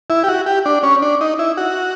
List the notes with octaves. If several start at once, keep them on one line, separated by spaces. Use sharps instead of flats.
E4
G4
F#4
G4
D4
C#4
D4
D#4
E4
F#4